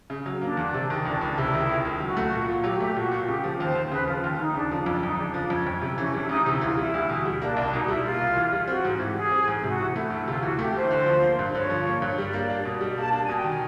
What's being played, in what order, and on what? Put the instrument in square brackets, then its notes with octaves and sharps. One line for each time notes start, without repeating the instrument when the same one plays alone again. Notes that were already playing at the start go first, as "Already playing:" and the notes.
[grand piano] C#3
F#3
[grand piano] A#3 [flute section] D4
[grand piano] E2
C3
D#3
[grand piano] C#2 [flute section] D4
[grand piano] C#2 [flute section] D4
[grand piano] C3 [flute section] E4
[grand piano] D#3
C#2
C#2
[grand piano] F#3 [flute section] F#4
[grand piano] A3
A#2
A#2
[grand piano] F#3 [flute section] G4
[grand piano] A3 [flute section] G4
[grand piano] A#2 [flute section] F#4
[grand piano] A#2
[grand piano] C#3 [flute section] G4
[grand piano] F3
[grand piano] D#2 [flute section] C5
[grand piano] D#2
[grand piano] C#3 [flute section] B4
[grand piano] F3 [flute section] F4
[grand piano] D#2
[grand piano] D#2 [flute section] D#4
[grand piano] C#3 [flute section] D4
[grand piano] F3
[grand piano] F2 [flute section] D4
[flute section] E4
[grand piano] F2 [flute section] D#4
[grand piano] C#3 [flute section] D4
[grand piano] F3 [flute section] D4
[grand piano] F2 [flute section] C#4
[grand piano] F2
C3
[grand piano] E3 [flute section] C#4
[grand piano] G3 [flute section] D4
[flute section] E4
[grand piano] D2 [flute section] D#4
[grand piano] C3 [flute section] E4
[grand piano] E3 [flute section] F4
[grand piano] G3 [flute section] E4
[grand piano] D2
B2
G3
[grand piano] A#3 [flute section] D4
[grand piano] C2 [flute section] D4
[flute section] D4
[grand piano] B2 [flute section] D#4
[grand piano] G3 [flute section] E4
[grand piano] A#3 [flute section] F4
[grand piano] C2
E3
G3
[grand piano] C4 [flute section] F#4
[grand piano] G#2
[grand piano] E3 [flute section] G4
[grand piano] G3 [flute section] G#4
[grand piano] C4
G#2
[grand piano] C3 [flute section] F#4
[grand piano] E3
[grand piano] A3 [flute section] E4
[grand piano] D2 [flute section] E4
[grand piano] C3 [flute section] F4
[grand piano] E3 [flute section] F#4
[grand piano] A3 [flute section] G4
[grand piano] D2 [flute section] C5
[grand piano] D3
F3
A#3
G2
[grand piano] D3 [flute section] C#5
[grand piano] F3
A#3
G2
[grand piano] G3 [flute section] D5
[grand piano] A#3
D4
B2
[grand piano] G3 [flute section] D#5
[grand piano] A#3 [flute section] A5
[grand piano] D4 [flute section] A5
[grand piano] B2 [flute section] G#5
[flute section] G5
[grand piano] D#3 [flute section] G#5